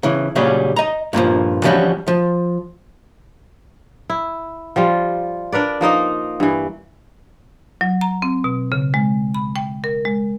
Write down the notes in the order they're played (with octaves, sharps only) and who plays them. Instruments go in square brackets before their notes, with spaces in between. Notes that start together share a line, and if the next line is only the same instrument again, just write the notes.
[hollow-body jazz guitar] C#3 E3
A#2 C#3 F#3 G3 C#4 G#4
D#5 A#5
G2 A#2 E3 F3
E3 F3 G3 C#4 F#4
F3
[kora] E4
F3 G3 F4
D4 A#4 B4 D5
F3 A#3 D#4 D#5
G2 E3
[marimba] F#3
A#5
C4
B2
C#3
G#3
B5
G5
A#4
G#3